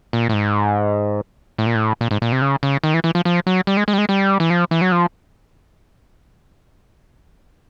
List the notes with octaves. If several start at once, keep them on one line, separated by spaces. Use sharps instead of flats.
A#2
A2
G#2
A2
A#2
A2
A#2
G#2
A#2
C3
C#3
C#3
D#3
E3
E3
F3
F3
F#3
G3
G#3
G#3
G3
G#3
G3
E3
F3
E3
F#3
F3